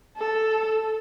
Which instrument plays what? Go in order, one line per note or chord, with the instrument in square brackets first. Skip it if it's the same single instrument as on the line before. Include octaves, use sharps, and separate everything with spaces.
[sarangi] A4